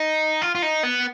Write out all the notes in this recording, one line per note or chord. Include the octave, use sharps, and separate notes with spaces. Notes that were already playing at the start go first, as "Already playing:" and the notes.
Already playing: D#4
F4
F4
D#4
B3